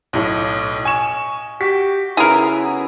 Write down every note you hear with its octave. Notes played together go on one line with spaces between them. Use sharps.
B1 A2 D#5 F5
G#5 C#6 E7
F#4 G4 B6
C#3 B3 E4 G#4 A#4